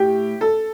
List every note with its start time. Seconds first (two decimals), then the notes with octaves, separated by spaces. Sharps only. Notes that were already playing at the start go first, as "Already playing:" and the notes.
Already playing: A2 G4
0.41 A4